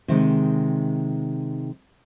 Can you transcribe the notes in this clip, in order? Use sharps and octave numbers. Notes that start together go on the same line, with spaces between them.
C3 D#3 G#3